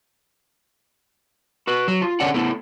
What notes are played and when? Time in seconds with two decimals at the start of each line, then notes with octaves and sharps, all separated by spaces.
1.67 F#4 B4
1.88 F#3
2.02 F4
2.20 D3 C#4 C#5 D5 F#5
2.34 A3 B3 E4